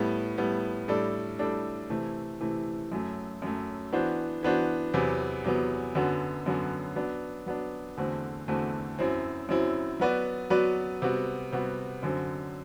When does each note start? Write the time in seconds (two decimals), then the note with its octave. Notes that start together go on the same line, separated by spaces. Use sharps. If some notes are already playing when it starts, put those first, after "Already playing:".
Already playing: A2 G3 B3
0.38 A2 G3 B3
0.88 A2 G3 D4 A4 D5
1.39 A2 G3 D4 A4 D5
1.90 C3 E3 A3
2.41 C3 E3 A3
2.92 F#2 F#3 A3
3.42 F#2 F#3 A3
3.93 E3 B3 D4 F#4 C5
4.43 E3 B3 D4 F#4 C5
4.94 E2 C3 F#3 B3
5.44 E2 C3 F#3 B3
5.95 F#2 D3 F#3 B3 F#4
6.46 F#2 D3 F#3 B3 F#4
6.96 F#3 B3 D4
7.46 F#3 B3 D4
7.97 E2 D3 A3 C4 F#4
8.48 E2 D3 A3 C4 F#4
8.99 F#2 F#3 C4 E4
9.49 F#2 F#3 C4 E4
9.99 F#3 B3 F#4 B4 D5
10.50 F#3 B3 F#4 B4 D5
11.02 C3 G3 B3 F#4
11.52 C3 G3 B3 F#4
12.03 F#2 D3 F#3 C4